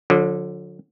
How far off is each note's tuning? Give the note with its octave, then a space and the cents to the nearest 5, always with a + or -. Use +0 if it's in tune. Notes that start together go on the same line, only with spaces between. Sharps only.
D3 +5 F#3 -45